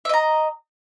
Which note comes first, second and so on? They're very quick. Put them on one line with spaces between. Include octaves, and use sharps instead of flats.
E5 D#5 A#5